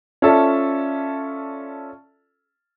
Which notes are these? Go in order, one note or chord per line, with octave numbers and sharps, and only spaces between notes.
C#4 F4 A4 D5 E5 A5